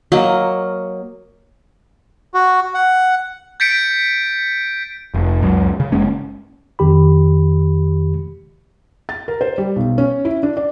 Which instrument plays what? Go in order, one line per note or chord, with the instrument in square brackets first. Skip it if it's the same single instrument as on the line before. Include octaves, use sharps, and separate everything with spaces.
[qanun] F#3 A#3 D#5
[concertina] F#4
F#5
[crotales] G6 A6 B6 C#7 D7
[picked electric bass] F1
C#2 F#2 C#3
C#3
F#1 G#3 A#3 C#4
[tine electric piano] F2 D#3 G4 B5
[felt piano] A6
A#4
C5
G3
B1
C#4
E4
D4
D5